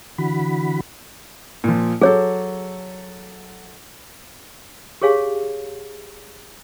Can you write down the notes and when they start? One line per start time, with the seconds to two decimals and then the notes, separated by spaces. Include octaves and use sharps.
0.18 D3 E3 F#4 B5
1.64 A#2 F3
2.01 F#3 G#4 A4 C#5
5.02 G4 G#4 C#5 F5 G#5